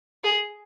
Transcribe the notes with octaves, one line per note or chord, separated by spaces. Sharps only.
G#4